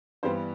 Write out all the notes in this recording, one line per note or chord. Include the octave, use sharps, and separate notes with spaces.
G2 E3 G3 B3 C5